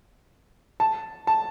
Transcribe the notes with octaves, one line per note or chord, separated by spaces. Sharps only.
A5
A5